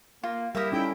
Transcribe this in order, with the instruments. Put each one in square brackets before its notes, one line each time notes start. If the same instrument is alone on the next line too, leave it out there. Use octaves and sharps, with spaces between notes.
[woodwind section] A#3 [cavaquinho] F4
[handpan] G3 [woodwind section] A#3 E4 G4 [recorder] A#4 [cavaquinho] E5 D#6
[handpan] C#4 D#4 A4 [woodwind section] E4 [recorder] G5